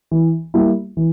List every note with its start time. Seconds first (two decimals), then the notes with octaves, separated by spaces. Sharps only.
0.11 E3
0.54 G3 A#3 E4
0.97 E3